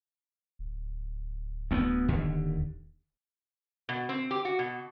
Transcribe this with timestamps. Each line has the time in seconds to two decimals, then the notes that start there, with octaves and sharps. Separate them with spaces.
0.59 D1
1.71 D2 A#3 B3
2.08 D#2 D3
3.89 B2
4.09 C4
4.31 G4
4.45 F#4
4.59 B2